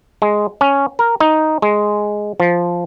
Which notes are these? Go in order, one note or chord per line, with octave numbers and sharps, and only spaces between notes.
G#3
C#4
A#4
D#4
G#3
F3